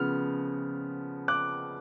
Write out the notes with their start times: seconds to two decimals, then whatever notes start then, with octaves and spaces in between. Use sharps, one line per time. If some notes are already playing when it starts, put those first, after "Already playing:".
Already playing: C#3 F3 B3 F6
1.28 D6 F#6